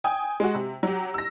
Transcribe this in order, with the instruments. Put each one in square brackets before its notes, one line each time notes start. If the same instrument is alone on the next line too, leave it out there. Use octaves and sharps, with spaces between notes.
[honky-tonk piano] G5 G#5 D#6
G#3 F#4
C3
F#3 G4
E6 A#6